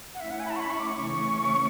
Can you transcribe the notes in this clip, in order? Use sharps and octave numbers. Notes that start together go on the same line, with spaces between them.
F#5
A3 C#4 E4 E5
F#5
G#5
B5
A5
C#6
B5
C#6
D6
C#6
C#3 E3 A3 C#4